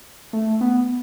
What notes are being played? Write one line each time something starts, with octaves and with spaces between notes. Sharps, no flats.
A3
B3